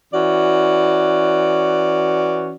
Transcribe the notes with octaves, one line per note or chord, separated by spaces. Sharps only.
E3 C#4 F#4 D5